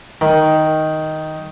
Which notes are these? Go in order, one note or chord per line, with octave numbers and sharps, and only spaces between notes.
D#3